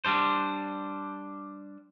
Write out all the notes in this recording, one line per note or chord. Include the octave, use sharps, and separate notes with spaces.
G3 D4 C5